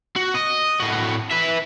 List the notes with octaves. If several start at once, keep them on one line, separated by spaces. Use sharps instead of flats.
F#4
D#5
A2 F#4
B4 E5